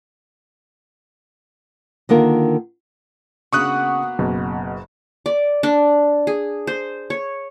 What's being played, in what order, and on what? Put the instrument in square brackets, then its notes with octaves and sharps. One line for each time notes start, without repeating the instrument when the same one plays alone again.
[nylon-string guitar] D3 D#3 A#3 F4 A#4
[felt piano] C#3 D4 [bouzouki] A#3 B3 F#4 [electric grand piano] C#6 D#6 F#6
[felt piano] F#1 [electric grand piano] B2
[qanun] D5
D4
G#4
C5
C#5